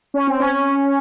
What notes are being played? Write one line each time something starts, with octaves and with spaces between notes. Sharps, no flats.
C#4
C4
C#4